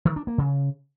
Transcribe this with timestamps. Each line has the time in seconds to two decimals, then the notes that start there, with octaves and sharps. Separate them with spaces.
0.05 D#3
0.16 D4
0.27 A#3
0.38 C#3